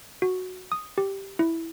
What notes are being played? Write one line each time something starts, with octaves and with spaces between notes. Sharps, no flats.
F#4
D#6
G4
E4